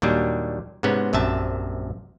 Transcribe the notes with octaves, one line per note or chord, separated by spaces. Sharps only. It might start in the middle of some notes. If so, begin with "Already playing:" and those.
D#2 A#2 F#3 G3 D4
G#2 C3 B3 C#4
A#1 F#2 C3 E5 A5